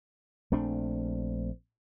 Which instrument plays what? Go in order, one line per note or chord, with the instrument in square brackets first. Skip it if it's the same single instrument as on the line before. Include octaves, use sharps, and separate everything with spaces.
[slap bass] A#1 A3 C4 D4